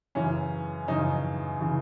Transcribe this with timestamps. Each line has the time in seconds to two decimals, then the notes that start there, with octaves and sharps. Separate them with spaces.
0.15 F#2 C#3 E3 C#4
0.88 F#2 C#3 E3 D#4
1.61 C#3 E3